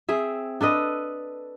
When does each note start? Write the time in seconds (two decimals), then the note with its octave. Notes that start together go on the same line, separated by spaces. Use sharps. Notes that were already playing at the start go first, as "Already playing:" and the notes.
0.09 C4 G#4 E5
0.61 D4 A4 B4 D#5